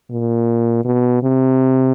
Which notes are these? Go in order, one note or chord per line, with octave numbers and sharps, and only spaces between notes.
A#2
B2
C3